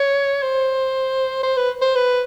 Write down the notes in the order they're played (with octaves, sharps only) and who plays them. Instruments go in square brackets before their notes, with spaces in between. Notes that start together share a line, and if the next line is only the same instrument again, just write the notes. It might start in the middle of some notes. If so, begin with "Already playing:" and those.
Already playing: [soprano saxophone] C#5
C5
C5
B4
C5
B4